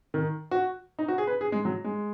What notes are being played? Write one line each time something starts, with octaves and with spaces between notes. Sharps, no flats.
D#3
F#4
D#4
F#4
G#4
B4
G#4
G#3
F#3
G#3